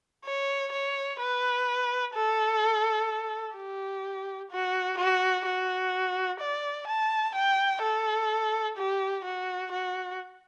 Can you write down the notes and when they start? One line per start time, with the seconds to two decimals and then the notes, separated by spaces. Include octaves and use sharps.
0.25 C#5
0.73 C#5
1.20 B4
2.14 A4
3.56 G4
4.51 F#4
4.98 F#4
5.46 F#4
6.40 D5
6.88 A5
7.35 G5
7.82 A4
8.77 G4
9.24 F#4
9.72 F#4